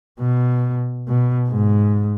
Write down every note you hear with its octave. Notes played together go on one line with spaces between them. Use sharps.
B2
B2
G#2